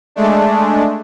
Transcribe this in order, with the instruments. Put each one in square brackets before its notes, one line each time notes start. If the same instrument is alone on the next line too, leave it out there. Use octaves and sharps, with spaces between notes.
[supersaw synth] G#3 A3 D4